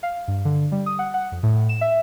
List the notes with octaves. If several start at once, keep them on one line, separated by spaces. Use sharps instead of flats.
F5
G2
D3
G3
D#6
F#5
F#5
F2
A2
E7
E5